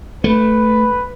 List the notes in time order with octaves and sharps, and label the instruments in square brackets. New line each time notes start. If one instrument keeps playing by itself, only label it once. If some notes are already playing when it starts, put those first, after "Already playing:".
[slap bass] A3 [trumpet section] B4